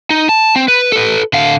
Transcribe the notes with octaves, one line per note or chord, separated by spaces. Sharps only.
D#4
A5
C4
B4
A4 B4
D3 F5